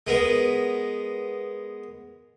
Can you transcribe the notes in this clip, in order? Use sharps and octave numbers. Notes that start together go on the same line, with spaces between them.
G#3 B3 A#4